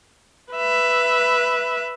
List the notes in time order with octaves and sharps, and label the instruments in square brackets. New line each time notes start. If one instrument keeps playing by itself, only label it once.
[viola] B4 E5